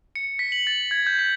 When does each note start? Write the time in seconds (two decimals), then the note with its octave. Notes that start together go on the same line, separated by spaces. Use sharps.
0.16 C#7
0.39 B6
0.52 F#7
0.67 A6
0.91 G#6
1.07 G6
1.19 B6